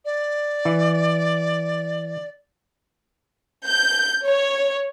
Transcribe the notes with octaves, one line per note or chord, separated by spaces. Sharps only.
D5
E3
G6
C#5